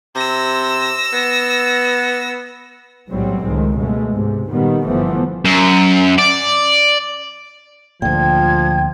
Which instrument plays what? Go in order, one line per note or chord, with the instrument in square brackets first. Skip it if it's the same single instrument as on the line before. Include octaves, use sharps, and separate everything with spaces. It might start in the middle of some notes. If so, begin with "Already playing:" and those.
[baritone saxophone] C3 [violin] E6 A#6
[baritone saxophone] B3
[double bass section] B1 A2 F#3 G3 C4
C#2 A2 D#3 G#3
G2 B2 G#3 A3
G#2 C3
A#2 D#3 G3 B3
G1 E3 F3 A3 B3
[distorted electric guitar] F#2
D5
[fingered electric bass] D2 A#2 [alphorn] F3 [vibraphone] G5 [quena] G#6